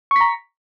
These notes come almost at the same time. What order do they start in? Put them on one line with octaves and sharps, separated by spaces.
C#6 B6 A#5